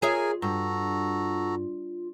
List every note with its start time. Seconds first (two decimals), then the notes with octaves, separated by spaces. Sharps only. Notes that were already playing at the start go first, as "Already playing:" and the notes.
0.02 F4 G#4 A#4 C#5 E5 G#5
0.42 G2 F#4 A4 A#5